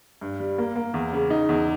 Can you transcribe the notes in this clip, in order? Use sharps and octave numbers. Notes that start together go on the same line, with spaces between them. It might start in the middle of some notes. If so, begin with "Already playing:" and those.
G2
G3
A#3
A#3
E2
C#3
D#4
E2